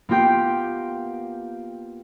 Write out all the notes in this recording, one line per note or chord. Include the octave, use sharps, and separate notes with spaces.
A#3 B3 F4 G4 G5